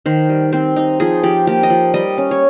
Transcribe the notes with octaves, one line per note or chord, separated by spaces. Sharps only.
D#3 C5
G3
C4 C5
D#4
F3 G#4
F3 G4
A#3 G4
D#5
F3
G3 D#5
C#4
C#5